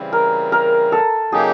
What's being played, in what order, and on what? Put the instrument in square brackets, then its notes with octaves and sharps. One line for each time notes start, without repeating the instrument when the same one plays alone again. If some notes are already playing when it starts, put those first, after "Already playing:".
Already playing: [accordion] C#3 E3 G3 C4
[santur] A#4
A#4
A4
[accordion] C#3 F#3 A#3 D#4 G4 [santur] G#4